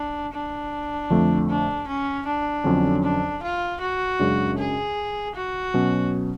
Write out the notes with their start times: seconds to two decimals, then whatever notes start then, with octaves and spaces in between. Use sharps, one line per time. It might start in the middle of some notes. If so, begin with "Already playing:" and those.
Already playing: D4
0.33 D4
1.10 F2 D3 F3 A3
1.49 D4
1.87 C#4
2.26 D4
2.64 F2 D3 F#3 C#4
3.03 D4
3.42 F4
3.81 F#4
4.19 F#2 C#3 G#3 D4
4.58 G#4
5.35 F#4
5.74 B2 F#3 C#4